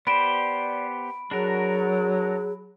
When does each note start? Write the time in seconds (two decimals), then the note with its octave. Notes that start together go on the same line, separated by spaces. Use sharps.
0.07 B3 G4 C5 D5 B5 D7
1.31 F#3 D4 F#4 G#4 A#4